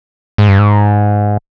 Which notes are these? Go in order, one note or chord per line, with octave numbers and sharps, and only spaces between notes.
G#2
G2
G#2